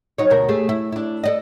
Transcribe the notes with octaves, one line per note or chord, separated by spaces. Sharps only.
F#3 D#4 C#5
D2 B2 A#4
A3 G4 G#4
E4
D4 E4
A4 D5 D#5